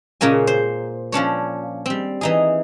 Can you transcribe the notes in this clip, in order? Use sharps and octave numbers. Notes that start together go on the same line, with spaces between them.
A#2 C#3 A#3 C#4 G#5
C5
F3 C#4 D4 C#5
G3 C4
E3 D#4 G#4